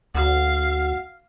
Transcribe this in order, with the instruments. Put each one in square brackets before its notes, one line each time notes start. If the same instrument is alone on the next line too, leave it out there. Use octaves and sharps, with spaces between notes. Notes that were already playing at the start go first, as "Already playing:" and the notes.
[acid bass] D2 [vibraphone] F#4 F#5 [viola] F5